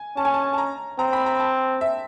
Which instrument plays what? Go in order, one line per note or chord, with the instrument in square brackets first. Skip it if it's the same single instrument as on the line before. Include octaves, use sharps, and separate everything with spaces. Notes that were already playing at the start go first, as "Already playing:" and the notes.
Already playing: [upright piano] G#5
[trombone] C#4 [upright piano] A5
[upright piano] G#5
A5
A5
A#5
[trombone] C4 [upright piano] A#5
[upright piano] B5
A#5
A5
E5